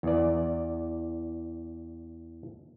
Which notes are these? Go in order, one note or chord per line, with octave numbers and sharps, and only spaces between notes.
E2 D5